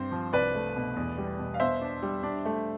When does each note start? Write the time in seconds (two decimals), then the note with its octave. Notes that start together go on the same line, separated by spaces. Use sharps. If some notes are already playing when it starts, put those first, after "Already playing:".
Already playing: G2 C4 C5
0.12 F3
0.33 C2 B4 D5
0.55 A3
0.76 B2
0.96 E2
1.18 G3
1.38 B2
1.54 F5
1.60 B2 C5 E5
1.81 D4
2.02 G3
2.23 D4
2.45 A3